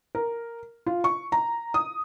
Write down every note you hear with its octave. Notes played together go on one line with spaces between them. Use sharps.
A#4
F4
C#6
A#5
D#6